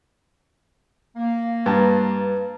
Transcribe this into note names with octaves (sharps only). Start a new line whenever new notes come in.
A#3
G2 B4 A5 A#5